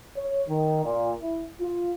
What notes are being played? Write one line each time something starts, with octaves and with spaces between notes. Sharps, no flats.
C#5
D#3
A#2
E4
F4